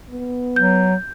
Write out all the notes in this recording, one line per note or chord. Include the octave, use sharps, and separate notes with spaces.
B3
F#3 G6